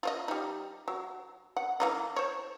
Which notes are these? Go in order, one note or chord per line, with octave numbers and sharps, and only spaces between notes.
F4 C5 D#5
G3 D#4
F#3
F#5
E3 A#3 D#4
C5 C#5